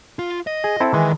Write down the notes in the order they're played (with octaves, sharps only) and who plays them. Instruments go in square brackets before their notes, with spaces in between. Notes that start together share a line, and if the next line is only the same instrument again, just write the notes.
[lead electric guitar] F4
D#5
[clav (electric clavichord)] G#4
C4 E4 A4
[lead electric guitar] D#3 [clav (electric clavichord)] E3 G#3